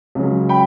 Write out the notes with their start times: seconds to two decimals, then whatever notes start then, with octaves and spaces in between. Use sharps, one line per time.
0.15 C#2 C#3 F#3
0.49 G5 B5